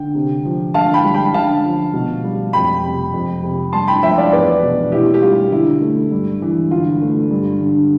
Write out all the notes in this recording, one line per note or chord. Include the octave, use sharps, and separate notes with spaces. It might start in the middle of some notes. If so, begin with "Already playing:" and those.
Already playing: D3 G5
C3
F3
D3 F5 A5
G5 B5
G3
G5 B5
D3 F5 A5
F3
B2
G3
F2 G5 B5
C3
F2
C3
G2 A5 C6
G5 B5
F3 E5 G5
D5 F5
E2 B4 D5
B2
B2 E4 G4
G4
G3 F4
D3 E4
A3
G2
E3
D3 F4
A3
G2
D3